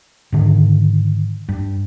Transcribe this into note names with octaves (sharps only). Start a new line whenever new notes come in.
G#2 D3 D#3
G2